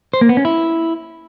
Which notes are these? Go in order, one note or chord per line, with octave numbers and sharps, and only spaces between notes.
C5
A#3
B3
C#4
E4